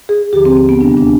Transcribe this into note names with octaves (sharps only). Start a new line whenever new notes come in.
G#4
D#2 D3 F3 G4
C4
C4
B3
D2 C3 D#3 G3 D4
D4